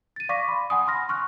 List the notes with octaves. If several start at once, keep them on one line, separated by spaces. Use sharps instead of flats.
A6 D#7
D5 F5 C#6 D6 A#6 B6
B5 C6
F#5 G#5 D#6
B5 C6 F6 A#6
C6 C#6 F6 F#6